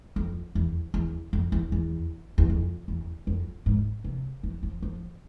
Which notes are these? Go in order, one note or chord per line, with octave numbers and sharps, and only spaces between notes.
F2
E2
E2
F2
E2
E2
E2
F2
E2
F2
G#2
C3
E3
F3
F3